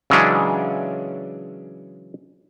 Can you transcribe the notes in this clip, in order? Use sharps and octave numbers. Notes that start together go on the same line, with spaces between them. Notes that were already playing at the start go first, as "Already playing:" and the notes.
C#3 E3 F#3 G#3 C#4 D4